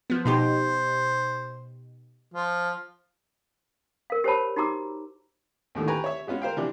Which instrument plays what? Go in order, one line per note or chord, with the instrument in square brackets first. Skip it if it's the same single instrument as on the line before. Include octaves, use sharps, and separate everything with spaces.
[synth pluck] F3 B3
[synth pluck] B2 D#4 G4 [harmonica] C5
[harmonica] F3
[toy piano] A#4 F5
G4 A#4 C5 C#5 A5 B5
D#4 F#4 G4 A#5 D6 E6
[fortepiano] D#2 A2 D3 D#3
B4 G5 G#5 A#5 C#6
C#5 E5
G#3 B3 C#4 F4 F#4
A#4 C5 F5 G5
C3 E3 F3 D4